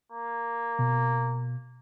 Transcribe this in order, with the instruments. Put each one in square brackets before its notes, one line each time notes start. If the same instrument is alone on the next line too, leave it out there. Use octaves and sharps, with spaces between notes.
[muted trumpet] A#3
[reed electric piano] B2